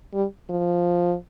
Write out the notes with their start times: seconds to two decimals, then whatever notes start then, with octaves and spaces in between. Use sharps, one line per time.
0.13 G3
0.50 F3